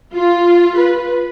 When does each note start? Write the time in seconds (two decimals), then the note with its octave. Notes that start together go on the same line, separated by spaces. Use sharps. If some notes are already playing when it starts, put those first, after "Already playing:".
0.14 F4
0.78 B4